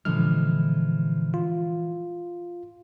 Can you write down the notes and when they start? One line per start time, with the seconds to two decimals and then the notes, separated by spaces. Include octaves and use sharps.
0.05 A#2 D3 E3 F3 G#3 F6
1.34 F4